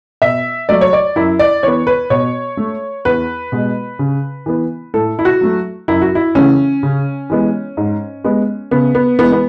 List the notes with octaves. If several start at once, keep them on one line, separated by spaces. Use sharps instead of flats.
B2 E5
F#3 A3 D5
C#5
D5
F#2 E4
D5
E3 B3 C#5
B4
B2 C#5
A3
E2 B4
B2 G#3
C#3
E3 B3
A2 A4
E4
F#4
F#3 A3
F#2 E4
F#4
E4
C#3 E3 A3 C#4
C#3
E3 G#3 B3
G#2
G#3 B3
C#3 B3
B3
E3 G#3 B3
B3